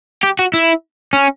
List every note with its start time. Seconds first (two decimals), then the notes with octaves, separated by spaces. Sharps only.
0.23 G4
0.39 F#4
0.54 E4
1.13 C#4